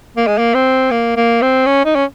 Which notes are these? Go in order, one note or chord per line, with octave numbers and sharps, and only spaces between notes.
A#3
G#3
A#3
C4
A#3
A#3
C4
C#4
D#4
C#4